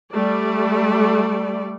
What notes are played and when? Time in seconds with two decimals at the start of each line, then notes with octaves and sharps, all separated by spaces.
0.12 G3 A3 D5